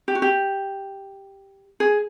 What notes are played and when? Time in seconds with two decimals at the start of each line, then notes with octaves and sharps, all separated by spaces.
0.08 G4
0.15 F#4
0.22 G4
1.80 G#4